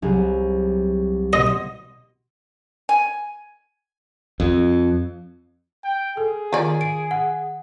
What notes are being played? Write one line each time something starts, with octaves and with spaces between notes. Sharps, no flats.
C2 F#3 G#4
B2 D#5 C6
G#5
F2
G5
G#4 A4
D#3 F4 D5
D7
F#5